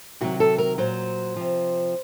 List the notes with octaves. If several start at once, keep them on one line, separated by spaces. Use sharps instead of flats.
C3 D#3 F#3 F#4
A4
A#4
A#2 F#3 C5
C3 F3